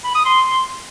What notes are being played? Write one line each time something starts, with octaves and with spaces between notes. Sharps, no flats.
B5
D#6
C6